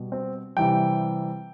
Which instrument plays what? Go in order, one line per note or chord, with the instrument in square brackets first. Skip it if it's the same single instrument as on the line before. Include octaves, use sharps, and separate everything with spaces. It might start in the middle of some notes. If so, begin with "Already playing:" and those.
Already playing: [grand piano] B2 G3
C4
C3 E3 G3 G5